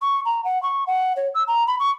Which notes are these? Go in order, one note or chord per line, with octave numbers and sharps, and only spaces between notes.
C#6
A#5
F#5
C#6
F#5
C#5
E6
A#5
B5
C#6